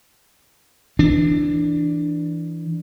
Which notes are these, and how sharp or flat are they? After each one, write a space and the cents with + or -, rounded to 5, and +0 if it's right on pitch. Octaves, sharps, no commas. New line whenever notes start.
E3 +0 D4 +5